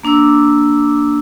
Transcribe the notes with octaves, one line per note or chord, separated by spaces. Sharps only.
A#3 D4 D6 E6